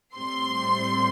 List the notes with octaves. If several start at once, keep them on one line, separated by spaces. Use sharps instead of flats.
A2 G3 C4 C6